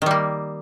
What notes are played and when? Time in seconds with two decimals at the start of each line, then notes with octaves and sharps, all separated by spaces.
0.02 D#3
0.06 G3
0.11 A#3